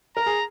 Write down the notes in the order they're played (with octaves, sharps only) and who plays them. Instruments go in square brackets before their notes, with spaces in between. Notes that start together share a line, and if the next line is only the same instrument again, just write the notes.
[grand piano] A#4 [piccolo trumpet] A#5
[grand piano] G#4